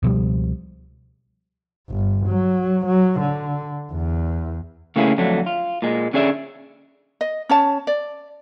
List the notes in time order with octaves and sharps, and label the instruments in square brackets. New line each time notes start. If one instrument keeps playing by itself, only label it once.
[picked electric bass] C#2 B2 F3 G3
[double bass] G1
F#3
F#3
D3
E2
[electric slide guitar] C#3 A3 A#3 C#4 E4 G#4
F2 D3 F#3 A3
F4
A#2 G#3
D3 C#4 G#4 D5 E5
[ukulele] D#5
C#4 C#5 A5
D5